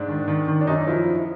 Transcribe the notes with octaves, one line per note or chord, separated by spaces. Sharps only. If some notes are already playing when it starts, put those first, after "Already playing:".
Already playing: G#2 D4
D#3
D#3
D#3
D4
F#2 D#4
F3 E4